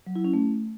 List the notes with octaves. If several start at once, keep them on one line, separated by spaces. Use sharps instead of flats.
F#3
E4
C#4
A3